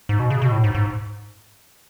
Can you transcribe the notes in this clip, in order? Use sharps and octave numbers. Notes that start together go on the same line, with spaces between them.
G#2
B2
C#3
B2
A2
G#2
G#2